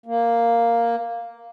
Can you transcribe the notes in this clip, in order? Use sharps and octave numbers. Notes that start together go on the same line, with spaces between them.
A#3